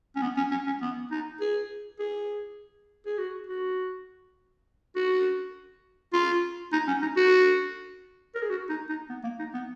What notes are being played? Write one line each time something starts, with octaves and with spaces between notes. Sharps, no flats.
C#4
B3
C#4
C#4
C#4
B3
D#4
G#4
G#4
G#4
F#4
F#4
F#4
F4
D#4
C#4
D#4
F#4
A#4
G#4
F#4
D#4
D#4
B3
A#3
D#4
B3